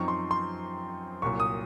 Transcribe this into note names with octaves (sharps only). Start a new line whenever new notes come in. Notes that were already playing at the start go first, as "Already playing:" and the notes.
Already playing: F#2 F3 C4 D#4 C#6
C6
C6
C2 A#2 F#3 C#6
D#6